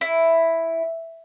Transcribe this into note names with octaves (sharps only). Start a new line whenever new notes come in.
E4